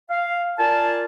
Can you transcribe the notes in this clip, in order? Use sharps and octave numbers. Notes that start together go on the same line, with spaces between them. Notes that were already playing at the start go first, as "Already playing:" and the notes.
F5
F4 A#4 D5 G#5 A5